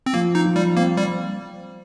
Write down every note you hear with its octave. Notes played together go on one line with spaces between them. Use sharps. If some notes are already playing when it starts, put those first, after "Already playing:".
C4
F3 A#3
D#4
F3
G3
A#3 C4
G3